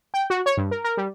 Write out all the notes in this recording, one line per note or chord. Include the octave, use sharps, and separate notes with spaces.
G5
F#4
C#5
G2
A#4
A#4
G3